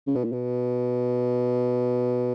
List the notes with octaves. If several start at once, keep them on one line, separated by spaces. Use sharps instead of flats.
C#3
B2
A#2
B2